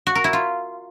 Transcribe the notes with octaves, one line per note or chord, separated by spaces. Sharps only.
F#4
A#4
E4
F4